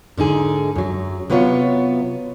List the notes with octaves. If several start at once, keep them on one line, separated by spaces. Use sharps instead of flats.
G#2 D3 D#4 G#4
F#2 F#3
C3 F#3 B3 F4 C#5